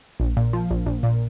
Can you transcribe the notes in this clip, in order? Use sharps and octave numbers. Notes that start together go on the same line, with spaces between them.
A#1
A#2
F3
A#1
A#1
A#2